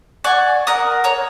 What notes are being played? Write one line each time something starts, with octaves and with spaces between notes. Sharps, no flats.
D5 F#5 G#5 C#6
A#4 F#5 D#6
C#5 A#5